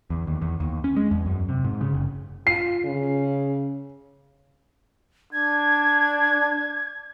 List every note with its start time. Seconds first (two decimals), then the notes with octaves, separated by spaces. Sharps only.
0.10 E2
0.27 D#2
0.42 E2
0.60 D#2
0.84 C#4
0.97 G#3
1.11 E2
1.26 F#2
1.49 C3
1.65 G#2
1.81 C#3
1.94 F#1
2.47 F4 C7
2.84 C#3
5.33 D4 G#6